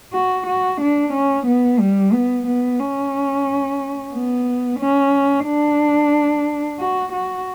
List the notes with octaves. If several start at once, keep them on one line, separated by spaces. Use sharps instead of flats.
F#4
F#4
D4
C#4
B3
G3
B3
B3
C#4
B3
C#4
D4
F#4
F#4